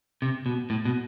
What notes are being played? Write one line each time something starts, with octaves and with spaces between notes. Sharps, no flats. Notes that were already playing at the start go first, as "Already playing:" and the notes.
C3
B2
A2
B2